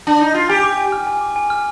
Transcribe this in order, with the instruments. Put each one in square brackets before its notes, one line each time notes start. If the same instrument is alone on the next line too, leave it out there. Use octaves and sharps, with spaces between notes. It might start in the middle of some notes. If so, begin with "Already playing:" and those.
[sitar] D4
D#4
F4
[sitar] G4 [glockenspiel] G#5
[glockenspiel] D6
G#5
F6
G#5
D6
G#5
F6